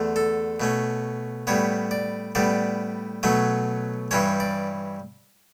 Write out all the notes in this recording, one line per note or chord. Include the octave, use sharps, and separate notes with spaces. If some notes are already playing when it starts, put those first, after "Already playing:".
Already playing: E2 D3 A3
A4
B2 A3 C#4
A2 G3 B3 C#5
D5
A2 G3 B3 D5
B2 F#3 A3 C#4
G2 E3 G3 C#4 C#5
D5